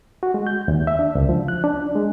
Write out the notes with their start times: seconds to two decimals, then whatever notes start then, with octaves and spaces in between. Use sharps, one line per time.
0.23 F#4
0.34 G#3
0.47 G6
0.68 D#2
0.87 E5
0.99 D4
1.15 C#2
1.29 F3
1.48 F#6
1.64 D4
1.95 G#3